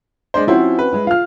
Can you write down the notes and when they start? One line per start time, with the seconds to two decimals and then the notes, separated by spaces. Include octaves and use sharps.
0.34 G#3 D4 C5
0.47 F3 C4 C#4 E4 F#4 C5
0.79 B4
0.93 G#3 E4
1.07 F4 F5 F6